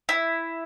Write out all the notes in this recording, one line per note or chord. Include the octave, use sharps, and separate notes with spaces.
E4